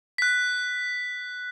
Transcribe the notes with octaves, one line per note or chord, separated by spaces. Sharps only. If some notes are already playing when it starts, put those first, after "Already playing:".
F#6 B6